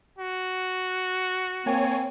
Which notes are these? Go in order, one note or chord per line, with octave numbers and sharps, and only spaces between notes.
F#4
A#3 C4 C#5 G#5